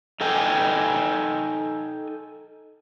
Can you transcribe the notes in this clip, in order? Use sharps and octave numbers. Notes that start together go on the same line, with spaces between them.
D#4 A4 D#5 G5 G#5